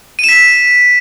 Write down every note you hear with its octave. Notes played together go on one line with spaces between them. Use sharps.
B6 D#7 E7